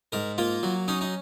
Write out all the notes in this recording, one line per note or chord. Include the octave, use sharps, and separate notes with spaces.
G#2 A#4
A#3 F4
F#3
C#4 D#4
D#4